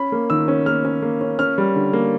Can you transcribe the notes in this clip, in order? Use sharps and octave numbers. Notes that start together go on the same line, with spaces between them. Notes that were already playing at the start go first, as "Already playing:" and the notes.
Already playing: C#4 B5
A#3
D#3 E6
C#4
A#3 F6
C#4
A#3
C#4
C#4 F6
G3
D3
A#3